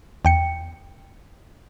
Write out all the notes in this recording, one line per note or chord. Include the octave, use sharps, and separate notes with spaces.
E2 G5 C#7